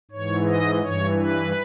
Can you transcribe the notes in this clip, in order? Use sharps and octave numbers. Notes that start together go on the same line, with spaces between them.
G#2 E3 C#5
D#5
G2 E3 C#5
B4